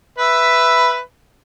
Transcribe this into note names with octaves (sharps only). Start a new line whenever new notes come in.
B4 E5